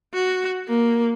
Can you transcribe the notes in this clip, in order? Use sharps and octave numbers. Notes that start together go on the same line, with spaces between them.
F#4
A#3